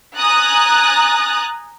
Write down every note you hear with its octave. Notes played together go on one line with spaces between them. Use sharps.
G#5 A#5 D#6 F#6 A6